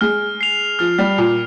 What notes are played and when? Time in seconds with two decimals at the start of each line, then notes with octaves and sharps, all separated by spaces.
0.01 G#3 F6
0.41 C7 F7
0.79 F3 F6
0.99 G3
1.18 A#2 C7 F7